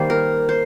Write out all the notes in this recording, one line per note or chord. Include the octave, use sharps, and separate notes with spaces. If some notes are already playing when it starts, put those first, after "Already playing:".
Already playing: D#3 G3 A#3 C5
A#4
C5